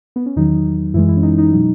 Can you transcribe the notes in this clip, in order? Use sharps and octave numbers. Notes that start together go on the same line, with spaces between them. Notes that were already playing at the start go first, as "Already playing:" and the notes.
B3
C#4
E2 D#3 F#3 D#4
F#2 E3 G#3 E4
E4
C#4
D#4
D#4
B2 F#3